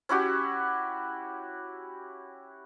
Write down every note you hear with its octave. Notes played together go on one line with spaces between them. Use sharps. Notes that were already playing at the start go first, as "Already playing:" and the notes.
C#4 E4 F#4 G4